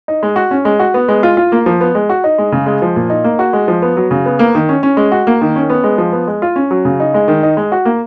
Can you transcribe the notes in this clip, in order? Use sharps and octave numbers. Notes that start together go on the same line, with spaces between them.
D#4
G#3
F#4
C#4
G#3
F#4
B3
G#3
F4
F4
A#3
F3
B3
G#3
F#4
D#4
G#3
C#3
G#3
F3
A#2
D#4
A#3
F#4
G#3
F3
B3
F#3
C#3
B3
A#3
D#3
C#4
C#4
G#3
F#4
A#3
D#3
C#4
B3
G#3
F3
B3
G#3
F4
C#4
F#3
C#3
D#4
G#3
D#3
D#4
G#3
F#4
A#3